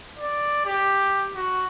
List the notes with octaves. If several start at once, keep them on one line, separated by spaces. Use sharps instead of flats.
D5
G4
F#4